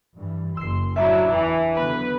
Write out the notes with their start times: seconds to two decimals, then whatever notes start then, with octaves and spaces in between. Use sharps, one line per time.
0.16 G2 E3
0.57 F#1 C6 E6 C7
0.96 A2 F#3 D4 E4 E5 A5 A#5
1.32 E2 E3
1.76 D3 F#3 B3 B4